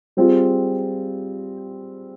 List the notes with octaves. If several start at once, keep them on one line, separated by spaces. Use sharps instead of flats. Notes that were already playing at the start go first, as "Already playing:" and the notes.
G3 C4 F4 G#4